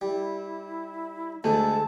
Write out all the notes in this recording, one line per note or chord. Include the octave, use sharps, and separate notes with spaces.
G3 E4
D2 G#3 A3 A4 A5